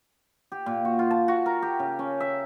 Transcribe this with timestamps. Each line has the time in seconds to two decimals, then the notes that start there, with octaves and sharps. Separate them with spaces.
0.52 G4
0.66 A#2
0.85 F#4
0.99 F4
1.11 A5
1.28 F#4
1.46 A#4
1.62 G4
1.79 C#3
1.99 C#4
2.20 E5